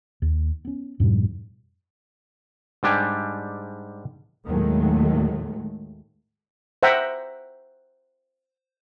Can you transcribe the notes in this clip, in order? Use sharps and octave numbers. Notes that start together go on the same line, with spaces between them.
D#2
B3 C#4
F2 G#2 B2 G3
G#2 G3 D4 G4 G#5
D#2 A2 D#3 F#3 G#3 A3
C5 E5 F#5 G5 A#5